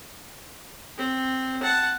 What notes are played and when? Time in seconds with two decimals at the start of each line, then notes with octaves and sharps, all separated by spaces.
0.98 C4
1.63 F#5 A5